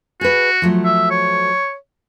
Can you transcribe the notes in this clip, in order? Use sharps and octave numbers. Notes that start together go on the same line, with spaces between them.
F#4 G#4 B4
F3 F#3 A3
E5
C#5